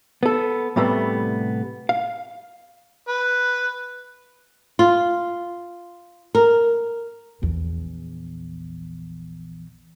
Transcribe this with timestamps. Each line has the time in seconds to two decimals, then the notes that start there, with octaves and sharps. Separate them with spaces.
0.23 B3 A4
0.76 A2 C3 G3 A3 B3
1.89 F5
3.08 B4
4.79 F4
6.35 A#4
7.42 A#1 E2